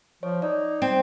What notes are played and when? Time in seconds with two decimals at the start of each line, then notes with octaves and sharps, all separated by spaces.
0.23 F3 C#5
0.42 D#4 D5
0.82 C4